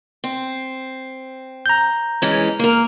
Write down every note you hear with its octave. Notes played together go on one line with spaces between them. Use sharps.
C4
A#5 G6
E3 G#3 C#4
A#3 A#4